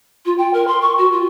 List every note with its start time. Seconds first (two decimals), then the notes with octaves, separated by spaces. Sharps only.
0.25 F4
0.38 G5
0.53 A#4
0.67 C6
0.81 C#6
0.97 F#4
1.12 F4